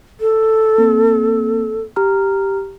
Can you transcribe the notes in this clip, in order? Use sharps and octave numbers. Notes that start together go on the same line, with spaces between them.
A4
A#3 C4
G4 A#5 F6